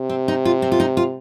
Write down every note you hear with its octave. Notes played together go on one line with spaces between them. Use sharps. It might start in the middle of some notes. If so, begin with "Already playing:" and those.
Already playing: C3
C4
D#4
F4
C4
F4
D#4
F4